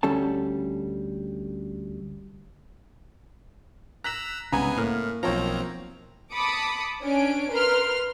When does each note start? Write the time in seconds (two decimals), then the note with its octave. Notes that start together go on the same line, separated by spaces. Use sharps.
0.03 D2 G3 C#4 A4 A5
4.04 A#5 E6 F#6 B6 F#7
4.52 C2 G#2 C#3 B3 G#5 A#5
4.78 A2 A#3 F6
5.23 B1 F3 C4 C#5 A#5
6.33 A5 B5 D6 D#6 C#7
7.03 C#4 D4 G#5 D7
7.52 A#4 B4 C6 F6